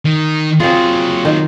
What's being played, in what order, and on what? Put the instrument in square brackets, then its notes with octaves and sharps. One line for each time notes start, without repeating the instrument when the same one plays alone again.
[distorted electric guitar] D#3
[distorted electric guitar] F#3 G#4 [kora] C4 F4
[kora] D#3